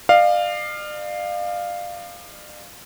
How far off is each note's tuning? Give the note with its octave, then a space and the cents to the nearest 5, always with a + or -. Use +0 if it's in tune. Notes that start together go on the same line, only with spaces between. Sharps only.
D5 +40 F5 +0